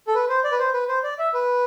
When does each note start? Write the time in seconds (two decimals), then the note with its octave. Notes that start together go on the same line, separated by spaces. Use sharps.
0.07 A4
0.15 B4
0.29 C5
0.44 D5
0.52 B4
0.59 C5
0.74 B4
0.88 C5
1.04 D5
1.19 E5
1.34 B4